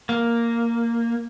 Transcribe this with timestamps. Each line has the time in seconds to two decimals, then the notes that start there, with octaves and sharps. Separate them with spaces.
0.09 A#3